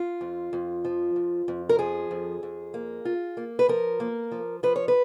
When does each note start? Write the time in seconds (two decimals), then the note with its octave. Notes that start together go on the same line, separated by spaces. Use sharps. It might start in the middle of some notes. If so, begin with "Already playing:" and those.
Already playing: F4
0.21 F2
0.53 F2
0.85 F3
1.16 F2
1.48 F2
1.69 A#4
1.79 F3 G#4
2.11 F2
2.43 F2
2.74 A#3
3.05 F4
3.37 A#3
3.59 B4
3.69 F3 A#4
4.00 A#3
4.32 F3
4.63 F3 B4
4.76 C#5
4.88 B4